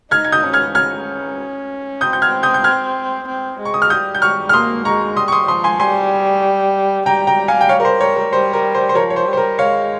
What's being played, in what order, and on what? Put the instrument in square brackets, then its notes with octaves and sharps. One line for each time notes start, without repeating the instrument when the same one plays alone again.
[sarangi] D#4 [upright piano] F6 G#6
[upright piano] G#6
D#6 G6
[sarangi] C#4
[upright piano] F6 G#6
[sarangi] C#4 [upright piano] F6 G#6
[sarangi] C4 [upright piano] D#6 G6
[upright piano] G6
F6 G#6
D#6 G6
G6
F6 G#6
[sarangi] C4
G#3
[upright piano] C#6
D#6
F6
[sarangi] G3 [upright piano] D#6 G6
[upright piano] G6
C#6 F6
F6
[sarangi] A#3 [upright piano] C6 D#6
[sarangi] G#3 [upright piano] A#5 C#6
[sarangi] G3 [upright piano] C6 D#6
[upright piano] C#6
C6 D#6
[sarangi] F3 [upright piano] C6 D#6
[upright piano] G#5 C6
[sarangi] G3 [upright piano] G#5 C6
[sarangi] G3 [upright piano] G5 A#5
[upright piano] G5 A#5
F5 G#5
G5
C#5 F5
A#4
C5
A#4 C#5
A#4
[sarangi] G3 [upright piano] C5
[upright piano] A#4
C5
C5
[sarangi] F3 [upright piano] A#4 C#5
[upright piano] C#5
C5
[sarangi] G3
[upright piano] C5
A#4
[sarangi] G#3 [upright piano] C#5 F5